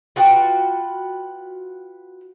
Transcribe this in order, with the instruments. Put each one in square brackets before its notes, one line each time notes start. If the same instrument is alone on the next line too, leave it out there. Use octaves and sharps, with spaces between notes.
[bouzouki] F4 F#4 B4 G5